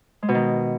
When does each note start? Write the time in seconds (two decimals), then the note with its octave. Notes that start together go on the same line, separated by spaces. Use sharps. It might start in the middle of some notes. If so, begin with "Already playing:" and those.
0.22 G#3
0.29 B2
0.35 D#3